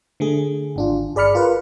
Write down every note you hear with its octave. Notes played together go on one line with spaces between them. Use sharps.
D3 A3 G#4
G#1 D4 F4
G1 G#4 D5 B5 F6 C#7
F4 A#4 B4